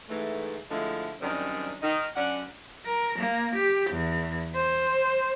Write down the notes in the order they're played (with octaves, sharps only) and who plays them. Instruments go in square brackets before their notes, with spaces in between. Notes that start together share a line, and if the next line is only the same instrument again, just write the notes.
[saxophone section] G#2 E3 A3
D3 F3 G#3 A3 E4
F#2 D#3 G3 C4 D4
D#3 D#4
F#2 C#4 D4 F#5
[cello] A#4
A#3
G4
E2
C5